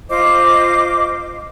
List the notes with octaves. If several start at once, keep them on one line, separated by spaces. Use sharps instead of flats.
F4 C5 D#5 D6